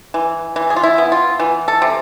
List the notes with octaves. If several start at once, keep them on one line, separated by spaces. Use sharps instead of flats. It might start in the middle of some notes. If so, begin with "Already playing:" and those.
E3
E3
G#4
F4
E4
B3
F4
E3
A4
C3